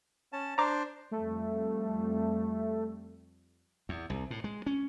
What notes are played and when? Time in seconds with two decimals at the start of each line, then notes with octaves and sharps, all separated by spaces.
0.33 C#4 A5
0.58 D4 C5 A#5 D6
1.11 F2 G3 A3
3.89 E2
4.10 C2
4.31 A2
4.44 G#3
4.66 C#4